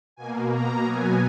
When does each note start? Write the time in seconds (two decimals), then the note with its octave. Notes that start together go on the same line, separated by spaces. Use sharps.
0.16 B2 A#3 G#5
0.50 A#5
0.83 B2 F#3 B3 G#5